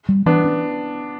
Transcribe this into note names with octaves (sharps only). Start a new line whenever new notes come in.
G3
E3 B3 D4
C#4